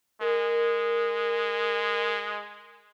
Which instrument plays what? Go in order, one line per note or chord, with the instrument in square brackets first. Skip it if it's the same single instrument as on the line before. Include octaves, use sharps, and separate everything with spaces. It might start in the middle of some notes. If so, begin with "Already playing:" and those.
[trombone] G#3 [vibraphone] A#4